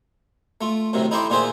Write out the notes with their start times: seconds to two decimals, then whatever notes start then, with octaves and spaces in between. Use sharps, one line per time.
0.61 A3 F4
0.93 F#2 A2 C3 D#3
1.11 D#4 E4 A4 G5 C6 D6
1.30 A#2 D#3 F4 G#4 C5 E5